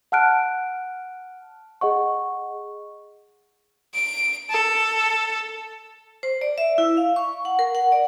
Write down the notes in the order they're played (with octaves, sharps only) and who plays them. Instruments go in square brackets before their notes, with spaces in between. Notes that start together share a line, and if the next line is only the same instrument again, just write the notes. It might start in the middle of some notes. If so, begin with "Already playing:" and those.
[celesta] F#5 A5 F6 F#6 D7
G#4 D#5 F#5 C#6
[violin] D7
A4
[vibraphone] C5
D5
E5
E4
F5
C#6
F#5
A#4
F#5
D5